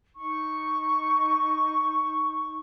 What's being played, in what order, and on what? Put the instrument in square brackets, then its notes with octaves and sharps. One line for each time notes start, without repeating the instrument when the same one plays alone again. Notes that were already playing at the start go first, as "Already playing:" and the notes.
[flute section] D#4 C#6